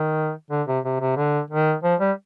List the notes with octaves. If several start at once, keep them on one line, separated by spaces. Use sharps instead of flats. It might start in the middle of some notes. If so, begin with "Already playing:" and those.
Already playing: D#3
D3
C3
C3
C3
D3
D#3
F3
G3